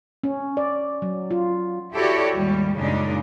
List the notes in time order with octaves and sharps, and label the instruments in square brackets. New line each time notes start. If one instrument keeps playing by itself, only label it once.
[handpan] C#4
D5
F#3
F4
[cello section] E4 F#4 G4 A4 C#5 D5
D#2 G#2 G3
F#2 A#2 C#3 G#3 D4 D#4